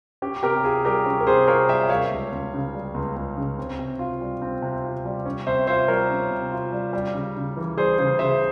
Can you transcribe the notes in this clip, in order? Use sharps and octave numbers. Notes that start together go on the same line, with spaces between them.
C#4 G4
C3 G4 A#4
F4 G#4
G3 G4 A#4
C#4
A#4
C3 G#4 C5
F4 A#4 C#5
G3 E5 G5
G3 C#5 F5
C#2
C#2
C#3
G3
C#2
C#2
C#3
C4
C3
F4
G3
C4
C3
F4
G3
C#4
C3 C5 E5
F4 C5 E5
G3 A#4 C#5
C#4
C3
F4
G3
G3
C#3
C#3
E3
G3 G#4 C5
C#3 G#4 C5
C#3 C5 E5